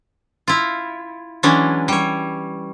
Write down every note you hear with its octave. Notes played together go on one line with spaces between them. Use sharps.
E4 F4
E3 F#3 G#3 C#4 D4
G3 C#5